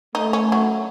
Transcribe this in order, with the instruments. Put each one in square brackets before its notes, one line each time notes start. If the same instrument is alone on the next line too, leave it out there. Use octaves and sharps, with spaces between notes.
[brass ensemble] A3 [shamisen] D#4
[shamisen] C#4
F#3